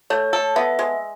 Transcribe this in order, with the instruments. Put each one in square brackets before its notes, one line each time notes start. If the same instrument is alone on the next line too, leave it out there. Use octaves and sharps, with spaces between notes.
[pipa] A3 [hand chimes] C#5
[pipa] A4
[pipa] B3 [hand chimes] E5
[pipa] G#3